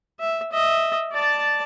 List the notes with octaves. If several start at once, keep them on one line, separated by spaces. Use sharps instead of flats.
E5
D#5 E5
D5 A5